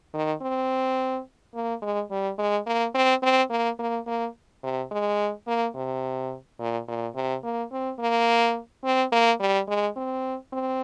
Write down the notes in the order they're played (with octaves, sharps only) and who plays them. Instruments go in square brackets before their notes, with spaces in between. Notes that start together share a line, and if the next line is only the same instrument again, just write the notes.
[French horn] D#3
C4
A#3
G#3
G3
G#3
A#3
C4
C4
A#3
A#3
A#3
C3
G#3
A#3
C3
A#2
A#2
C3
A#3
C4
A#3
C4
A#3
G3
G#3
C4
C4